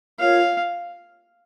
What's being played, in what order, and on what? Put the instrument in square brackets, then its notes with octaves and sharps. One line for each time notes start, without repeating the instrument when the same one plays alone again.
[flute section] F4 A#4 C#5 [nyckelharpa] F5